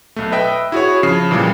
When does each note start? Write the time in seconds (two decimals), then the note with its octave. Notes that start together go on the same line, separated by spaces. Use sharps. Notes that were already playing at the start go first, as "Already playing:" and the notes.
0.16 B1 A3
0.32 B4 D#5 E5 G5
0.72 E4 F#4 G#4 C#5
1.03 C#3 F3 B5 C7
1.31 A#2 C#3 E3 G3